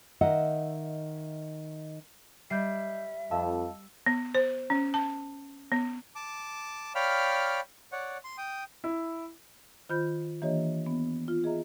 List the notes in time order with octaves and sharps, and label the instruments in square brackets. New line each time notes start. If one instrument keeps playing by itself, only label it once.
[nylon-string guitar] D#3 D#5 E5 F#5
[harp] G3 [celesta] D#5 G6 C7 [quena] E5
[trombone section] F2 [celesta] D#5 F5 A5 [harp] E6
[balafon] B3
C5
C#4
A5
B3
[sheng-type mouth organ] A5 D6
C#5 D5 F5 G5 B5 F6
C#5 D5 F#5
C6
G5 D#6
[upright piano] E4
[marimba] D#3 F4 C5 B5 G6
E3 A#3 D4 G4 C#5 D#5
B3
F4
G#4 D#5 E5 A#5